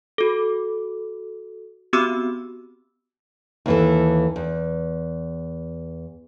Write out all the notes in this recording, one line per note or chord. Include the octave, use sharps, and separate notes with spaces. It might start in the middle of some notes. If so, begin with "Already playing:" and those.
F#4 A4
B3 C4 F#4 G4 D6 E6
D#2 E3 A4
E2